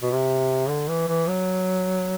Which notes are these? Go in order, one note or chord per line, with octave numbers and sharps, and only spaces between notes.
B2
C3
D3
E3
E3
F#3